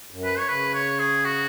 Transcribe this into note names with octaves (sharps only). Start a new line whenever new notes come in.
F#2
B4
C#5
C#3 B4
C#5
G#4
F#4